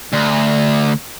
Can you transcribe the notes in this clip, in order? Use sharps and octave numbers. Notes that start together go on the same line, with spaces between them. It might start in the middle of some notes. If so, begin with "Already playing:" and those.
D2